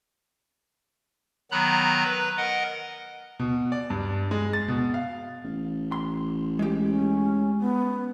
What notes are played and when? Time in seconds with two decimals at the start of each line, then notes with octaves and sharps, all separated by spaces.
1.51 D#3 F#3 B3 A#5 B5 F#6
2.04 B4
2.37 A#4 D#5 F#5
3.39 B2
3.72 D5
3.90 G2
4.31 G#3
4.53 A6
4.68 B2
4.94 F5
5.44 A1
5.92 C6
6.59 G#3 G4
6.84 C#4
7.60 B3